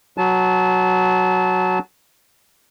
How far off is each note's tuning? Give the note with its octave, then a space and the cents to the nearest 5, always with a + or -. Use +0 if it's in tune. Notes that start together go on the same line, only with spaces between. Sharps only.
F#3 +0 A5 -25